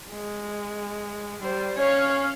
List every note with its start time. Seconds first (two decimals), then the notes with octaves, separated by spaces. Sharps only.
0.10 G#3
1.42 G3 C5
1.78 C#4 C#5 F5